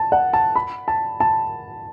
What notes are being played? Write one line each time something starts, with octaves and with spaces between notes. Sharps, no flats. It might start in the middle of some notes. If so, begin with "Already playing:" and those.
Already playing: A5
F#5
A5
B5
A5
A5